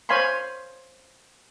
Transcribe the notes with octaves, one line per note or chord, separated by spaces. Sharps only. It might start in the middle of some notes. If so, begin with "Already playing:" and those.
C5 C#5 F5 G#5 B5 C6